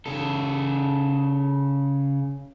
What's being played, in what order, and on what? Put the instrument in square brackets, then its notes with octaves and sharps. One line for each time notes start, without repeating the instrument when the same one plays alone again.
[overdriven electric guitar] C#3 A4